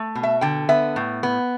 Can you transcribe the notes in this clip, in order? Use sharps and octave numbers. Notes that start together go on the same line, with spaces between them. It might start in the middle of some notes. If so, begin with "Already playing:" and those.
Already playing: A3
B2
E5
D3 G5
B3 E5
A2
B3